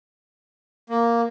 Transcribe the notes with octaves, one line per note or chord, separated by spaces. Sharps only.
A#3